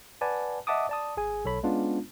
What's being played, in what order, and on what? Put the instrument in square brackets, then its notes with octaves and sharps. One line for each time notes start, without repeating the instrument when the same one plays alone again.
[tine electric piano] B4 D5 F#5 G#5 A5 B5
D#5 E5 F#5 A5 D6 D#6
D5 A5 D#6
G#1 G#4 G#5
B1 A4 C#5 B5
G#3 B3 C#4 D4 F4